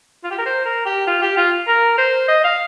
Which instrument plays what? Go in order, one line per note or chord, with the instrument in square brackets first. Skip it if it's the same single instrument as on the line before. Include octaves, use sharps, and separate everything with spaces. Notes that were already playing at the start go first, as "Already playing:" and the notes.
[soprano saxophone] F4
G4
A#4
C5
A#4
G4
F4
G4
F4
A#4
C5
D#5
F5